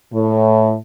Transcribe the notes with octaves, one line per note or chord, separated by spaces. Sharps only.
A2